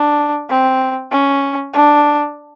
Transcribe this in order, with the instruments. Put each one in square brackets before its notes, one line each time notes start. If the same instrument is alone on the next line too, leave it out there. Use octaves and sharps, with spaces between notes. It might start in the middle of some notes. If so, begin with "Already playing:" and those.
Already playing: [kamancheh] D4
C4
C#4
D4